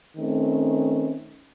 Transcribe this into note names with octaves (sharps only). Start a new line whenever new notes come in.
D#3 A3 C4 C#4